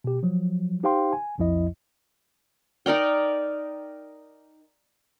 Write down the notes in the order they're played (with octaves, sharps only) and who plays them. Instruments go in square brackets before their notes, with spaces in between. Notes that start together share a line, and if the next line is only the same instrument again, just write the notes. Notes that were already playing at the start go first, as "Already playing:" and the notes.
[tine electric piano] B2 G4
F3 F#3
D#4 G4 C5 F5 G5 C6
G#5
B1 F2 F3 E4 D#5
[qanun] D#4 A#4 D5 G5